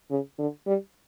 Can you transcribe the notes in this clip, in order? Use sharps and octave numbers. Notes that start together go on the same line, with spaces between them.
C#3
D3
G3